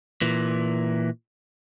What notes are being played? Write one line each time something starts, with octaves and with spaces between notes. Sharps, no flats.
A#2 E3